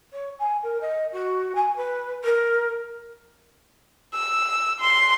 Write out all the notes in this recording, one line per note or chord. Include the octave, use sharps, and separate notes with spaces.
C#5
G#5
A#4
D#5
F#4
G#5
B4
A#4
E6
C6